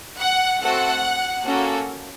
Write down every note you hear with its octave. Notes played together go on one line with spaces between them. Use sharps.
F#5
A3 C4 F#4 A4 F#5
A#3 C#4 F#4 A4